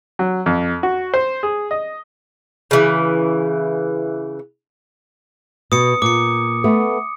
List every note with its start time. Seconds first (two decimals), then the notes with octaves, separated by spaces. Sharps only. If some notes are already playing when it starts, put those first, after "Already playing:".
0.19 F#3
0.46 F2
0.83 F#4
1.14 C5
1.43 G#4
1.71 D#5
2.71 C#3 E3
5.72 B2 D#6 C#7
6.02 A#2 D6 C#7
6.64 A3 B3